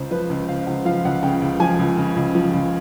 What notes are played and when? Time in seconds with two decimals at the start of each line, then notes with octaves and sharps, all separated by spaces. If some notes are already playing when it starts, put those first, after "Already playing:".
Already playing: C#2 C#3 C5
0.11 F3 B4
0.30 C#2
0.48 C#3 F5
0.67 C#2 F#5
0.85 F3 F5
1.05 C#2 F#5
1.23 C#3 G5
1.42 C#2
1.60 F3 G#5
1.79 C#2
1.97 C#3
2.16 C#2
2.35 F3
2.54 C#2